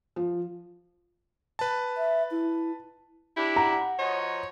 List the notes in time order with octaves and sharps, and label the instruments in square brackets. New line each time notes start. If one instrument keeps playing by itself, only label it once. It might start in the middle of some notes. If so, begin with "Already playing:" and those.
[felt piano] F3
[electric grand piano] B4 A5
[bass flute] E5
E4
[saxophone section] D4 G4 [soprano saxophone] E4
[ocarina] F#5 [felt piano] A#5
[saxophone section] F3 F#4 D#5 [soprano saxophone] C#5